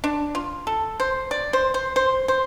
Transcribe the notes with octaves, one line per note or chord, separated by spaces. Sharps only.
D4
F4
A4
C5
D5
C5
C5
C5
C5